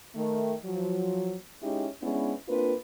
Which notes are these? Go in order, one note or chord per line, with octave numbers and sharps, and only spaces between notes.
D#3 A3
F3 F#3
G#3 C#4 D#4 E4 G4
G#3 B3 C#4 D4 E4
A#3 C4 D4 F4 B4